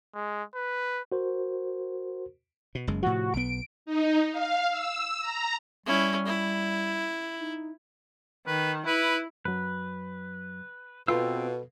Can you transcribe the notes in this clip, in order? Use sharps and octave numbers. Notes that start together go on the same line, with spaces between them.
G#3
B4
F#4 A#4 C5
B2
F#1 F#2 G#3
A2 C3 F3 F#4
B1 B3 D7
D#4
F5
E6
A#5
G3 C#4 E4
E4
D#4
D#3 B4
E4 B4
F#2 F#3 B4
B2 C4 F4 A4 B4 G5 E6